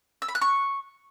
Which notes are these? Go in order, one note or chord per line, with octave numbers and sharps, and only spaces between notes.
E6
B5
F#6
C#6